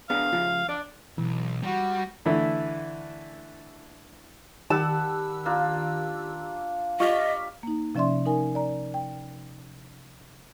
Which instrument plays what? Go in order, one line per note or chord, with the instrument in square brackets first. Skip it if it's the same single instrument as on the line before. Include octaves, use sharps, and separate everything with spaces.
[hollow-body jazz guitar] B3 D4 G#4 [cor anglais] F5
[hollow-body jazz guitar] C#3 F3 F4
[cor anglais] D4 [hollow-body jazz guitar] D5
[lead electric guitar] B1 [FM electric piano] E3
[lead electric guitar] G3 [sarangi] F#4
[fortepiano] D3 E3 A3 E4
[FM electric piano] D#3 G4 E6 [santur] G3 F#5 [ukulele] A5
[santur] A#3 D4 F4
[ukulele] F4 [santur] G4 D5 [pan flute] D#5 [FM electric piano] C#6 F6 B6
[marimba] A#3 D#4
C3 F3 C#4 D5 E5 C6
D#4 A#4 G#5
D5 A#5
G5